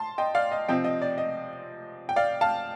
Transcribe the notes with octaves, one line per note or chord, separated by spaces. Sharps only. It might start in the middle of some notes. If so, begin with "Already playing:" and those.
Already playing: A5 C6
D#5 G5
D5 F5
D#5
C3 F3 C4 D#5 G5
D#5
D5
D#5
G5
D5 F5
F5 A5